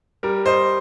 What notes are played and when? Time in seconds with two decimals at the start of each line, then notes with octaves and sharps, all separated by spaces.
0.23 G3 A#4
0.46 C5 D#5